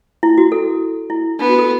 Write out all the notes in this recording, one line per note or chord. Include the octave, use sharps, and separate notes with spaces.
E4
F#4
A4
E4
B3 D4
F#4
A4